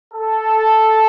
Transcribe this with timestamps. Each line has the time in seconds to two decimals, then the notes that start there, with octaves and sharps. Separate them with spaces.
0.14 A4